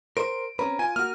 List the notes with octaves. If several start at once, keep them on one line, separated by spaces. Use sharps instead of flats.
A#4 C5 D7
C4 C#4 B4 A#5
F4 G#5 D#7
A#3 F#4 F6